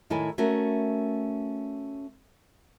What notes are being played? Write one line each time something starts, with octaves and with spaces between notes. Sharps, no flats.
A2 D#3 E4 A4 C#5 G#5
A3 C#4 F#4 A#4